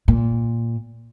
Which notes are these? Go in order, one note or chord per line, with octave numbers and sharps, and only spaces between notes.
A#2